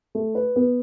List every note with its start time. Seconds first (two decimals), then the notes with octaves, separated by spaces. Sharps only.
0.15 A3
0.35 B4
0.56 B3